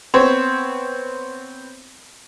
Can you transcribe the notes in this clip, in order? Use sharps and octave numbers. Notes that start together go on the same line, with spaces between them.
B3 C4 C5 C#5